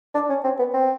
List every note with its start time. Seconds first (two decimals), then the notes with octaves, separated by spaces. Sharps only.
0.14 D4
0.29 C#4
0.44 C4
0.59 B3
0.74 C4